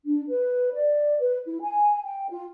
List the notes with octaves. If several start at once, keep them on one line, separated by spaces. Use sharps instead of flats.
D4
B4
D5
B4
E4
G#5
G5
F4